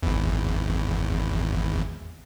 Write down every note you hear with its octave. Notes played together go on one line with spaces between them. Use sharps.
G#1 E2